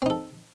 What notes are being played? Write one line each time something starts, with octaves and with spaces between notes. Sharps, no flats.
C4 D#4 A4